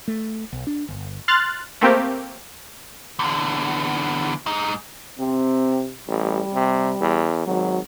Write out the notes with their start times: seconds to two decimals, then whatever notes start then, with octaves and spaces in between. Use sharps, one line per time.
0.08 A3
0.53 B1
0.67 D4
0.89 G1
1.28 C6 F6 F#6 A6
1.81 A3 A#3 C4 G4
3.19 E2 D3
4.46 G#2 D#4
5.19 C3 C4
6.08 A1 G3
6.54 C3
7.01 E2
7.47 G#1 F#3